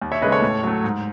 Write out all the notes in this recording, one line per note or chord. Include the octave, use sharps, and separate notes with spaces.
D#2
C#5 E5
C#3 G#3 B4 D#5
A4 C#5
A2
F#3 A3
G#2